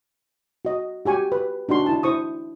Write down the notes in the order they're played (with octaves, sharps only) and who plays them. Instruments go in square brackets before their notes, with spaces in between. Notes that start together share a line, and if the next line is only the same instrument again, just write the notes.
[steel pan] F#4 D#5
F#4 G4 G#5 C#6
B4
D4 D#4 F#4 C6
E4 A5
E4 C5 C#6 D#6